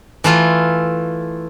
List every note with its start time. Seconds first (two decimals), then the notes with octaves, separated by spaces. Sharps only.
0.24 E3 A3 F4